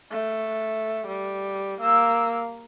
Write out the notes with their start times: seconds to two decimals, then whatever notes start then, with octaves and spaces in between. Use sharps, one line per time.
0.11 A3
1.07 G3
1.81 A#3 E6